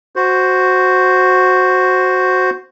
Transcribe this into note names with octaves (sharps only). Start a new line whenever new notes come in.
F#4 C5